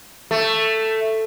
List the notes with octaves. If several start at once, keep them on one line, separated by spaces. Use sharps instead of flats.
A3